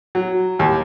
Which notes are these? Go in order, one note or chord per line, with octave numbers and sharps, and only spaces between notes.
F#3
D#2